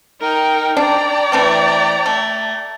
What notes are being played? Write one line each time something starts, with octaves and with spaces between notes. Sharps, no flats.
D#4 A#4 G5
D4 D5 G5 A#5
E3 A3 C4
A3